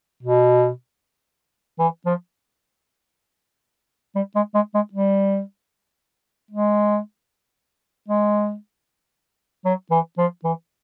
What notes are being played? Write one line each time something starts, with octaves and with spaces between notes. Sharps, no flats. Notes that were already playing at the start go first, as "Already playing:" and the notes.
B2
E3
F3
G3
G#3
G#3
G#3
G3
G#3
G#3
F#3
E3
F3
E3